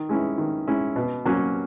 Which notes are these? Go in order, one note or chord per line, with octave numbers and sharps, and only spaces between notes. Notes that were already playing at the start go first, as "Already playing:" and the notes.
Already playing: D#3
G#3 C#4 E4
D#3
G#3 C#4 E4
B2
F#3 A#3 C#4